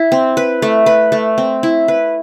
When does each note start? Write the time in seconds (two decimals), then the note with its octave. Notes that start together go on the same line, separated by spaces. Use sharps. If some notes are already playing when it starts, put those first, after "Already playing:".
Already playing: E4
0.12 C4
0.37 B4
0.62 A3
0.86 B4
1.12 A3
1.38 C4
1.63 E4
1.88 B4